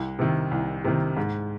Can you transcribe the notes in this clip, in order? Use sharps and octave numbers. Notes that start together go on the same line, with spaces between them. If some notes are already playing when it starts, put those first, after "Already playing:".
Already playing: C2
C3 D#3
C2
C3 D#3
G#2